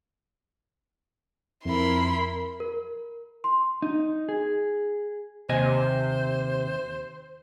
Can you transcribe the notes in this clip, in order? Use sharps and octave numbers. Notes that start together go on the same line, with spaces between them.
F2 E4 A#4 B5 C6
A#4
C6
D#4
G#4
D#2 C3 C5 D#5 G#5